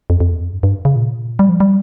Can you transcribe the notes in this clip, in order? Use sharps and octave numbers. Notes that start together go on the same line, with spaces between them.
F2
F2
E2
F2
G2
G2
C#3
A#2
G3
F3
G3